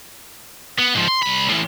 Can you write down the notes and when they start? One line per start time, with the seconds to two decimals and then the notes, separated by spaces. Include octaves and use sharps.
0.78 B3
0.94 G#2 F3
1.08 C6
1.22 C2 B5
1.49 A2 E3